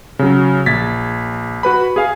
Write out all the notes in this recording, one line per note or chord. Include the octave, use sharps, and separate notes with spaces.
C#3 F#3
A#1 G#6 A6 B6
F#4 B4 B5
G#4 F5 G#5